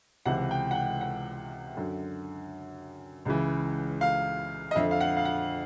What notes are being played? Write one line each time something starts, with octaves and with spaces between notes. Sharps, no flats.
C#2 C3 E3 F#5
G5
F#5
G5
F#5
F#2 D3
C#2 C#3 E3
F5
D#5
F2 D3 E5
F5
F#5
F5
F#5